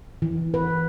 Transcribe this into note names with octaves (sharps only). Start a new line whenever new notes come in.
E3
B4